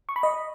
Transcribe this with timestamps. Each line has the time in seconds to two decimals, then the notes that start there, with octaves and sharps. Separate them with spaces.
0.09 C#6
0.16 B5
0.23 D#5